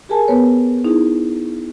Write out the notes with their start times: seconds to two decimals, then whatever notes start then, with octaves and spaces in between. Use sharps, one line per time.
0.09 G4 G#4 A#4 G#5 A5
0.28 B3 B4 C#5
0.85 D#4 E4 G#4